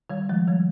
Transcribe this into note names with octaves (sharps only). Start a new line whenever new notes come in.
D#3 G3
F3 G#3
D#3 G3